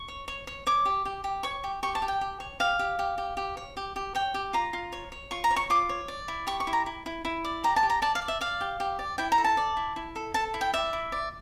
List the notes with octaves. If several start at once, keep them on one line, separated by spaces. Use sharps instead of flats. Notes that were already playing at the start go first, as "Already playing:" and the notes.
Already playing: C#6
C#5
C#5
C#5
C#5 D6
G4
G4
G4
C#5 C#6
G4
G4 C#6
A5
G4
G5
G4
C#5
G4 F5
G4
G4
G4
G4
C#5
G4
G4
C#5 G5
G4
F4 A#5
F4
C#5
C#5
F4 C#6
A#5
C#5
C#6
F4 D6
C#5
D5
E4
G4 C#6
C#6
E4
A#5
E4
E4
E4
D5
G4 A#5
A5
G4
A#5
D5 A5
F5
D5
E5
D5 F5
G4
G4
D5
E4 G5
A#5
A4
A5
D5
E4
E4
A4
A4 A5
E4
G5
D5 E5
E4
D5